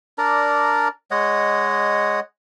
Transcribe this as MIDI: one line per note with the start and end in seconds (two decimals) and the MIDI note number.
0.18 0.88 62
0.18 0.88 70
0.18 0.88 74
0.18 0.88 82
1.11 2.20 56
1.11 2.20 73
1.11 2.20 75
1.11 2.20 78